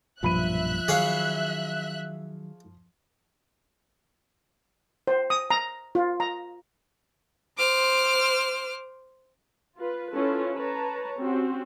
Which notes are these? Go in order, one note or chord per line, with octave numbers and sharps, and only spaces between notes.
B1 G2 A#2 F3 E5 B5 F#6 D#7
D#3 F#3 G#4 C#5 F5
C5
D#6
A#5
F4
A#5
C5 D6 F6
F4 B4
C#4 E4 F4 A4 B4
B4 C#5 A5 A#5
C4 C#4 F#4 G4